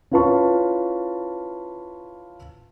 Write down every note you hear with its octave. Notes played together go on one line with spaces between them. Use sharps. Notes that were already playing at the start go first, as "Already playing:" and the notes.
C#4 E4 F4 B4 A5 C#6